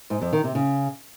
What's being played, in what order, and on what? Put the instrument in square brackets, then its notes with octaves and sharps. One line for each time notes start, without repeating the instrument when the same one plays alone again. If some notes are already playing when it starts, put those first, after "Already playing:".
[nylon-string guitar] G#2
F2
D#3
C3
C#3